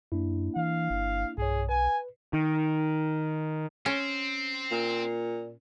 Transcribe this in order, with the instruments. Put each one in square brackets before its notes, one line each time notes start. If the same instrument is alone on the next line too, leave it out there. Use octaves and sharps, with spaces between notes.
[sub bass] F#2 [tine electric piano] A#3 D4 E4
[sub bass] E3 [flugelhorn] F5
[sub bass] G1
[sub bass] B1 [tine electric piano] G2 C#5 [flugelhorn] G#4
[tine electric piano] B4 [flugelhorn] G#5
[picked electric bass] D#3
[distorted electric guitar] C4 [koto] C#4
[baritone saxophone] A#2